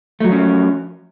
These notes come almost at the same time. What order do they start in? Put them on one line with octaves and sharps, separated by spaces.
A3 F#3 F3 C#4